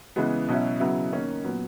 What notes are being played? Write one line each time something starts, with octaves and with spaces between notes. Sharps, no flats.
C#3 E3 G#3 B3
B2 F#3 C#4 E4
C#3 F#3 B3 E4
D#3 A#3 C#4
A#2 F#3 B3